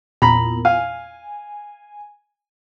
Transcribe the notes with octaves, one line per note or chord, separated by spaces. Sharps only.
E2 A#2 A#5 B5
F5 G#5